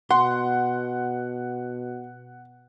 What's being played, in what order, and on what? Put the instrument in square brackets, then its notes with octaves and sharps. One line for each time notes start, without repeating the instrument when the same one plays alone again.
[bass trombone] B2 [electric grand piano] F#5 [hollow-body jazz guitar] C6